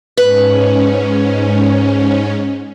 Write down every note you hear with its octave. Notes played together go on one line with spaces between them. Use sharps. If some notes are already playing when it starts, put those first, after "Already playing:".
G#2 C#4 B4